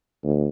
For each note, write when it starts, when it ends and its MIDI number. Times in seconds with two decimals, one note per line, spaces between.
0.24 0.48 38